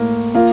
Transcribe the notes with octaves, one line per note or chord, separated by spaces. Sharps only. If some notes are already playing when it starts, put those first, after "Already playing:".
Already playing: A2 A#3
A#3 F4